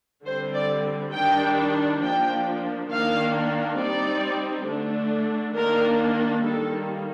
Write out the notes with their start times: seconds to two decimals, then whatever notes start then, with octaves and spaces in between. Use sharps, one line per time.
0.25 D3 G3 C4 C5
0.54 D5
1.13 D#3 G3 D4 G5
2.01 F3 A#3 D4 G5
2.90 D#3 A#3 D4 F5
3.78 G3 C4 D#4 D5
4.67 D3 A3 D4
5.55 D#3 A#3 D4 A#4
6.43 D#3 G3 A#3 A4